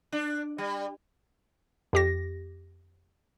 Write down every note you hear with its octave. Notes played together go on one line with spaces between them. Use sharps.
D4
G3
F2 G4 A#6